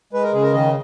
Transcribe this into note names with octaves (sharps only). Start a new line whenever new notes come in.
G#3 B4
A#4
C#3 G#4
A#4
D#3 D#5